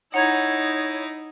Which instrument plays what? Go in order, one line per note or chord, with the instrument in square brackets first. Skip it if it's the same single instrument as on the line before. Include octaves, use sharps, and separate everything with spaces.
[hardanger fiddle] D#4 E4 [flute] C#5 [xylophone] F#5 A#5 G#6